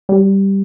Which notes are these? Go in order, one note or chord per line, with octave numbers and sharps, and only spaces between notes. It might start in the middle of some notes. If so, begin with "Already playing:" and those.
G3